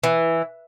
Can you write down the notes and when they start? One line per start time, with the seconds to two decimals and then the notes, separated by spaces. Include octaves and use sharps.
0.03 E3